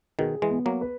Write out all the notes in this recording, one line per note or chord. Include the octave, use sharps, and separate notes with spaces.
B2 D#3 G#4
E3 G#3
B3
F#3 A#3
B4